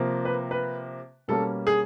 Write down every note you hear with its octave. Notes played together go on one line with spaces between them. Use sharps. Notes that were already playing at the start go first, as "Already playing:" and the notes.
Already playing: C3 F3 A#3
B4
B4
B2 G3 A#3 C#4 A4
G#4